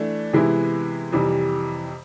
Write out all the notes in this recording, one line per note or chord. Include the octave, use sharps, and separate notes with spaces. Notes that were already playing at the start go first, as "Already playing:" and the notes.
Already playing: E3 A3 D4
C3 E3 G#3 B3 E4
F2 C3 E3 G3